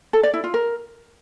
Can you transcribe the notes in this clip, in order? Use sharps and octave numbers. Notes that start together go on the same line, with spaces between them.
A4
D5
E4
F4
A#4